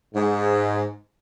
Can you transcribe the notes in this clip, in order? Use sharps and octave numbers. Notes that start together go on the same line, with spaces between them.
G#2